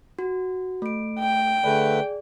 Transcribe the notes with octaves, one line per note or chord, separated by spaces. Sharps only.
F#4
A3 D7
G5
D3 A3 G#4 B4 D5